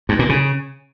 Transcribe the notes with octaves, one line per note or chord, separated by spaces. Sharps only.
G2
A#2
C#3